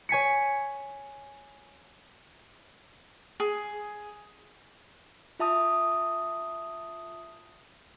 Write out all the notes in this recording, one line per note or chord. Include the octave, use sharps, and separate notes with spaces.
C#5 G#5 B6 C#7
G#4
F4 E5 A5 D#6